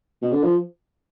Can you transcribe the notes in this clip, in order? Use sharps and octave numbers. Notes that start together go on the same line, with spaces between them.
B2
D3
F3